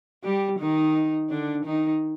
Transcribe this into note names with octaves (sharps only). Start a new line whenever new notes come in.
G3 G4
D#3 D#4
D3 D4
D#3 D#4